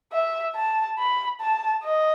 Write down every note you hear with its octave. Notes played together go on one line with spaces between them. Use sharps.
E5
A5
B5
A5
D#5